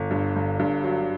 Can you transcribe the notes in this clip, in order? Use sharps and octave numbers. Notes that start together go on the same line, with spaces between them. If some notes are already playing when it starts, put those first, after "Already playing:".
Already playing: G1
G2
G1
G2
F#3